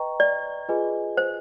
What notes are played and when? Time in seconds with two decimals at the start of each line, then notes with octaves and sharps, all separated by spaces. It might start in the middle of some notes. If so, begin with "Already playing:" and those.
Already playing: B4 D#5 G5 A#5 C#6
0.20 D5
0.69 F4 G#4 B4 D#5 G#5
1.17 C5